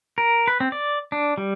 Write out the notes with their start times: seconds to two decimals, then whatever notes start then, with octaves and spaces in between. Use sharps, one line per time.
0.18 A#4
0.48 B4
0.60 C4
0.72 D5
1.12 D4
1.38 G3